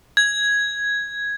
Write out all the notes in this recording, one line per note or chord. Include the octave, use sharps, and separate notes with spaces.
G#6